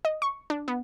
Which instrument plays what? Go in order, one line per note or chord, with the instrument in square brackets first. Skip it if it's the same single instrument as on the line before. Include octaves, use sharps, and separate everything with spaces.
[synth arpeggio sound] D#5
C#6
D4
B3